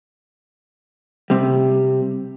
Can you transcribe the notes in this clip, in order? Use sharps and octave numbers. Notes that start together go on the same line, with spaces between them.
C3 G3